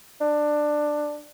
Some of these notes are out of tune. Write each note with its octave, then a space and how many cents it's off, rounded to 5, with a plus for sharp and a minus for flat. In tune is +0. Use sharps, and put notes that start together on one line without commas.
D4 +15